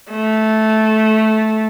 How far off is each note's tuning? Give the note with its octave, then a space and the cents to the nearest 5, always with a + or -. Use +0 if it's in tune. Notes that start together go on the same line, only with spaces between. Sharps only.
A3 -10